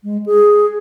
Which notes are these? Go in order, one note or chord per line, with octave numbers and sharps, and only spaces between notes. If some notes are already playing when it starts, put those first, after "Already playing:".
G#3
G#4